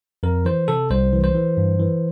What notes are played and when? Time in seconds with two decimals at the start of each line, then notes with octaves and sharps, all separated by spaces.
0.23 F2 A#4
0.45 E3 C5
0.68 C3 A4
0.90 C2 C5
1.13 E3
1.24 C5
1.35 E3
1.57 G2
1.79 E3